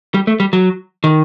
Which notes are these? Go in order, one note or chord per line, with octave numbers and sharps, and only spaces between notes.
G3
A3
G3
F#3
D#3